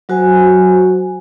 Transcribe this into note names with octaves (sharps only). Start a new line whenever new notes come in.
F#3 F#4 C5 G#5